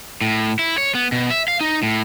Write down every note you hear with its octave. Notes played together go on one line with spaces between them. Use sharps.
A2
E4
C#5
B3
B2
E5
F5
D#4
A2